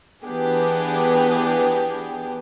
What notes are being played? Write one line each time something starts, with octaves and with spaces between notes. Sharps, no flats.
E3 B3 D4 G4 G#4